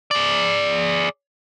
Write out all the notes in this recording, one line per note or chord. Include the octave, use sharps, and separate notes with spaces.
G#4 D5